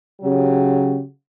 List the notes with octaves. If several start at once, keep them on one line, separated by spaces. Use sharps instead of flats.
C#3 F#3 F#4 G4